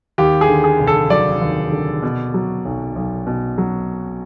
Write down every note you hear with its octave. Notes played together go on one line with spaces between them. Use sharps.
D#2 G4
G#4
D3
G#4
F1
A4
F#3 D5
D#2
D3
B2
F#3
B1
B1
B2
F#3